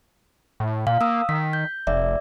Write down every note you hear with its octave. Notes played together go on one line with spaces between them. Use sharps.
A2
A#2 F5
A#3 D#6 E6
D#3 B6
G6
F1 D5 E5